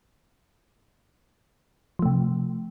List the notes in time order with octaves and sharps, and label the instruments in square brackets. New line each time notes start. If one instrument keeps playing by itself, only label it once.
[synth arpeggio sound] F3
A3
C3